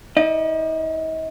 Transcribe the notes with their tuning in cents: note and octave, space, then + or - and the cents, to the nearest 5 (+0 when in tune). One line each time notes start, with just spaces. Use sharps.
D#4 +40 D#5 -35